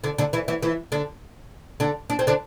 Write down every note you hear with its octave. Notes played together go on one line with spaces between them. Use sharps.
D3 D4
D3 D4
E3 E4
E3 E4
E3 E4
D3 D4
D3 D4
D4
C4
D3 D4